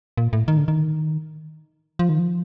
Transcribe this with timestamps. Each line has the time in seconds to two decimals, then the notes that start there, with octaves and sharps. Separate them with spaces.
0.17 A#2
0.33 A2
0.48 D#3
0.57 D3
0.68 D#3
1.99 F3
2.09 D#3
2.19 F3